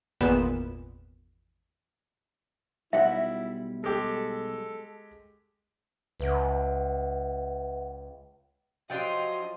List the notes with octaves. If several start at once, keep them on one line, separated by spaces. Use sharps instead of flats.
G#1 E2 A#2 B3 B4 E7
B1 G3 E4 E5 F#5
G#3 G4 A4
C#2 B4 E5 F#5
F3 F#3 D4 F4 G4 D#5 G5 C6